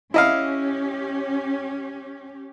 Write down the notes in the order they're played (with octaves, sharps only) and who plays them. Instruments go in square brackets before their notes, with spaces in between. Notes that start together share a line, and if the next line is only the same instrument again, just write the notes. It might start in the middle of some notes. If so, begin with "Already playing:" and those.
[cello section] C#4 G4 [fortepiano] E4 D#5 F5